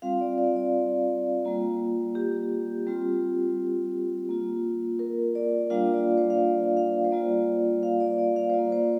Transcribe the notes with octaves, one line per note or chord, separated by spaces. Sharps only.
G3 C4 F4 F5
D5
D5
D5
G3 A#3 F4
G4
G3 C4 F4
A#3 F4
A#4
D5
G3 A#3 D4 F4 F5
D5
D5
C5
F5
D5
F5
C5
G3 A#3 F4 D5
F5
D5
D5
F5
C5
A#3 F4 D5
C5